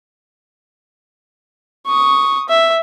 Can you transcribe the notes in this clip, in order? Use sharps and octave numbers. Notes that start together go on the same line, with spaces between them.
C#6 D#6
E5